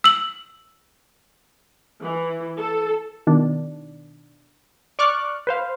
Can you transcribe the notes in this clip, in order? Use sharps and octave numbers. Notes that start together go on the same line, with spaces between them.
E6 F#7
E3
A4
B2 D#3 D4
D5 C#6 D6 F6 F#6
B4 C5 F5